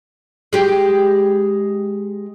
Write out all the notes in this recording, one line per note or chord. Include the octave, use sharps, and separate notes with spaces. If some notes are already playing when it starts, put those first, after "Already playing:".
G#3 G4